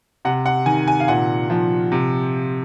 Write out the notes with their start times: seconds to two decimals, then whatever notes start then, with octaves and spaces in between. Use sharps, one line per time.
0.25 C3 F#5
0.46 F#5
0.66 D#3 G#5
0.88 G#5
1.00 F5
1.08 A#2 F#5
1.50 F3
1.92 C3